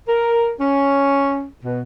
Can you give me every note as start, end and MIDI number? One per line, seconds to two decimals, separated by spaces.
0.07 0.52 70
0.60 1.46 61
1.64 1.80 47